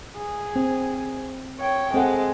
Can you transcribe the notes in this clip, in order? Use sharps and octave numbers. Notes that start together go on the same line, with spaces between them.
G#4
C4
C#5 G5
G#3 C4 A4 F#5